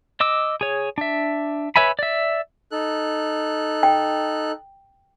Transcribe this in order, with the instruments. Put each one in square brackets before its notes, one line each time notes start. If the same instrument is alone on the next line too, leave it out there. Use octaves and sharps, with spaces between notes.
[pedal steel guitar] D#5 D6 E6
G#4 C#5
D4 E5
B4 C#5 E5 G#5 B5
D5 E5
[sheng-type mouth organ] D#4 A4 F#6
[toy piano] G5